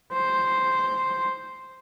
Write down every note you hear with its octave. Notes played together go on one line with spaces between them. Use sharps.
C5